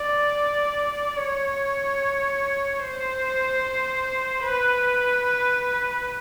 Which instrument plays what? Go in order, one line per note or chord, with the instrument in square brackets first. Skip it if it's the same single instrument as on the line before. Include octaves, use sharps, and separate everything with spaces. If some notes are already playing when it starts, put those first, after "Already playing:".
Already playing: [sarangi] D5
C#5
C5
B4